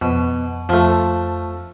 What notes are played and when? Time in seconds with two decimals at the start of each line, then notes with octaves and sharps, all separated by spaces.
0.02 F2 B2
0.69 F2 F3 A3